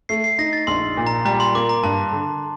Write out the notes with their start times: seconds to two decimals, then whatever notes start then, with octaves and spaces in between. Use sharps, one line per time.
0.09 A3 C7
0.24 C7
0.38 D#4 A#6
0.53 A6
0.67 A#1 C6
0.97 A#2
1.07 A#5
1.25 G3 A#5
1.40 C6
1.55 A#3 D6
1.69 A#5
1.83 G2 A5
2.12 D3